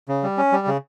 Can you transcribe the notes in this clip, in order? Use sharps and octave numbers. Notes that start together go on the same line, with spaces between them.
C#3
G3
C#4
G3
C#3